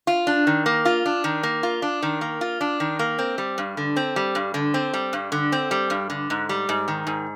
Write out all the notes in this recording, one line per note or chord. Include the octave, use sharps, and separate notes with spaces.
F4
D4
D#3
A#3
F4
D4
D#3
A#3
F4
D4
D#3
A#3
F4
D4
D#3
A#3
C4
G3
G2
D3
C4
G3
G2
D3
C4
G3
G2
D3
C4
G3
G2
D3
G#2
G3
G#2
D#3
G#2